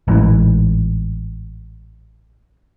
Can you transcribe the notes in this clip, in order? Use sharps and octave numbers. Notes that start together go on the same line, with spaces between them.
A1 G#2 E3